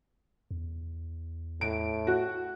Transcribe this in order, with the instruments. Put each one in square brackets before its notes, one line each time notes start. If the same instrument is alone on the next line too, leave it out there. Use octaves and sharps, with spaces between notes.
[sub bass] E2
[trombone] A2 [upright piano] D7
[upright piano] F#4